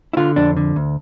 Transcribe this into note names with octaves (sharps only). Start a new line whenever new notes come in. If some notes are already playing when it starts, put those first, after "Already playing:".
E4
D3 F4
F2 D4
D3
D2